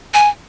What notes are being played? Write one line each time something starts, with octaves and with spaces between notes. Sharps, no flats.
G#5